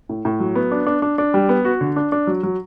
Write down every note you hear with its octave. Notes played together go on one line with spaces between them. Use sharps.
A2
A2
F#3
B3
D4
D4
D4
D4
G3
B3
F#4
D3
D4
D4
F#3
F#3